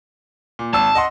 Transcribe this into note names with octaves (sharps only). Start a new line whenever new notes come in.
A#2
G#1 A5 E6
D#5 F#5 C6